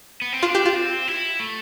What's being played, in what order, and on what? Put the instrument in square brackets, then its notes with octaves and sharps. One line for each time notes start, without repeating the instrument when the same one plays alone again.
[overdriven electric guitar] B3
C4
[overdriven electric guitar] D4 [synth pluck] F4
[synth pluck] G4
F4
[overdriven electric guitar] C4
E4
A3